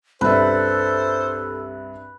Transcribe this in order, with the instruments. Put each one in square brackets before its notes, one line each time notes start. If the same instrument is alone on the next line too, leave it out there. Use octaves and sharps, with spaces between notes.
[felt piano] C2 G2 E5 [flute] A4 [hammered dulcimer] B4 [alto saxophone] C5